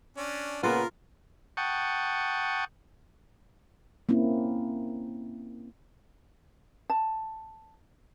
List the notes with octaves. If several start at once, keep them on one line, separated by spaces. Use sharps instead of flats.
C#4 D4
A#2 C#3 B3 F4 A#4
F#5 G5 A5 C#6 D#6
A#3 C4 C#4 E4
A5